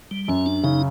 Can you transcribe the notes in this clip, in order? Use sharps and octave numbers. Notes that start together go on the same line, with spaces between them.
G3
F#2 C#4
D4
C#3 D#4